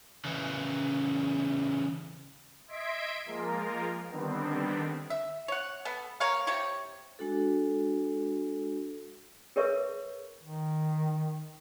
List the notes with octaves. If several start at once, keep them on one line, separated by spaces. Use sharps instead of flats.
C#3 E3
D#5 E5 C6 G#6 B6 D7
F3 G#3 A#3 F4 A#4
D3 D#3 G3 B3 C4 D4
E5
C#5 F#5
B3 A4
A#3 A#4 C#5 F5
C3 G4 C#5 C#6
G#3 D4 F#4 A4
G#4 A#4 B4 C#5 E5 C#6
D#3